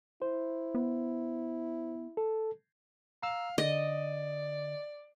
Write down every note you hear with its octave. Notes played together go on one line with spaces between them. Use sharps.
E4 C5
B3
A4
F5 A#5 E6
D3 D5 D#5